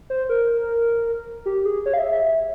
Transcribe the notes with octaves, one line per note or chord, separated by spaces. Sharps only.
C5
A#4
G4
G#4
C#5
F5
E5
E5